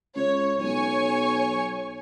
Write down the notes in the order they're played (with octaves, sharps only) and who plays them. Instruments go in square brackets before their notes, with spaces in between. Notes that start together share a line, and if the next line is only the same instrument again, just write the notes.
[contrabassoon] C#2 [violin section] C#5
[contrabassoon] B1 [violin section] C#5 G#5 C#6